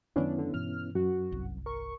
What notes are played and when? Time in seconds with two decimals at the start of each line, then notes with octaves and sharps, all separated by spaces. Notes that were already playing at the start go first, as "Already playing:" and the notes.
0.16 F#2 D#3 F#3 B3 C#4 D4 E4
0.38 D3
0.54 G2 B2 E3 F6
0.95 F#2 F#4
1.32 G1 C2
1.66 A#4 C#6